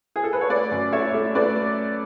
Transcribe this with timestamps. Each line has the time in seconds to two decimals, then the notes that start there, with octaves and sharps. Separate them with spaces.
0.16 G#4
0.24 A4
0.33 B4
0.41 C#5
0.50 A3 B4 D5
0.71 F#2
0.92 A3 C#5 E5
1.14 A3
1.35 A3 B4 D5